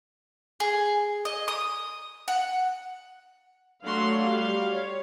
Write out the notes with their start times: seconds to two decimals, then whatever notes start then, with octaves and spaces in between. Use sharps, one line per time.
0.60 G#4
1.25 D#5
1.48 D#6
2.28 F#5
3.84 F#3 A3 D4 F#4 F5 C6
4.27 G3 F5
4.71 C#5